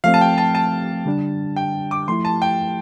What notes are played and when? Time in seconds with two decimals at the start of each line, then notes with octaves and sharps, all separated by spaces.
0.04 F3 A3 C4 F5
0.14 A5
0.21 G5
0.38 A5
0.55 A5
1.05 D3 G3 D4
1.56 G5
1.91 D6
2.08 F3 A3 E4 C6
2.25 A5
2.42 G5